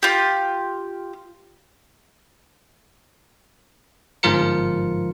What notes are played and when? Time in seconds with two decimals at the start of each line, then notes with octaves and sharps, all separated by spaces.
0.03 F4 G4
4.23 G1 G#2 F3 F4 A#4 C#7